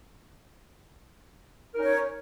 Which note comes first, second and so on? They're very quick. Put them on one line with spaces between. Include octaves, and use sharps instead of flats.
A#4 D#4 C#4 C#5